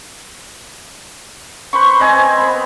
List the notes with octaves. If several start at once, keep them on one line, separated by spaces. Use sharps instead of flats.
B4 C5 B5 C#6
C4 D#5 G#5
B3 B5